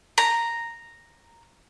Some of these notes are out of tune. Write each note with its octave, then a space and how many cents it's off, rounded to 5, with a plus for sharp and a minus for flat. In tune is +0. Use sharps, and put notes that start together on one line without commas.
A#5 -5